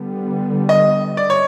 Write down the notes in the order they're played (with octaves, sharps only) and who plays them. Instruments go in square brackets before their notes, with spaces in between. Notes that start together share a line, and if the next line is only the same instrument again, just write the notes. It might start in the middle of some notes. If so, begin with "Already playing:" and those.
Already playing: [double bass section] D3 G3 B3
[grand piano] D#5
D5
C#5